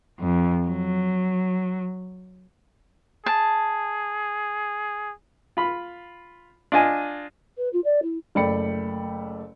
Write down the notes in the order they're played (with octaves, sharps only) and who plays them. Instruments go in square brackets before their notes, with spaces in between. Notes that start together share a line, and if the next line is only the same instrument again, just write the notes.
[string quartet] F2
F#3
[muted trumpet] G#4 [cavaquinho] A5
[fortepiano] F4 B5
D4 F4 D#5 G#5
[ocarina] B4
F4
D5
E4
[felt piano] F#1 A3 D5 G5 B5 C#7